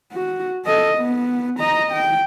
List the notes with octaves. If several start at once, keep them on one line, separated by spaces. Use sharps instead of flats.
F#4
A4 D#5
B3
D#5 A#5
G5